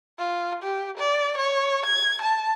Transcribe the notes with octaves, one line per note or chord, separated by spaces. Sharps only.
F4
G4
D5
C#5
G#6
A5